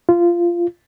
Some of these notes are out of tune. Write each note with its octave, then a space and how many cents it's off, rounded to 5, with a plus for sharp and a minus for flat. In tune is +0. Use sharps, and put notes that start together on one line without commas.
F4 -15